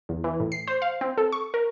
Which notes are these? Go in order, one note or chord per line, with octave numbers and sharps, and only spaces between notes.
E2
E3
A2
C7
C5
F5
C4
A4
C#6
A#4